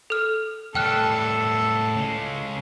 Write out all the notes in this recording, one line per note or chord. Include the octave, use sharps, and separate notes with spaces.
A4 F6
A2 G3 A4 G5 F6 F#6
C#3 G#3